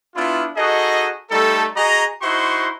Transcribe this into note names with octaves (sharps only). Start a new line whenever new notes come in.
B3 D4 E4 F4
D#4 F#4 G#4 A4 D#5
G3 A3 D#4 A4
F#4 G#4 D#5 A#5
D#4 E4 F#4 C5 C6 C#6